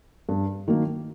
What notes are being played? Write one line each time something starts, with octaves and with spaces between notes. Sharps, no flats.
G2
D#3 F#3 A#3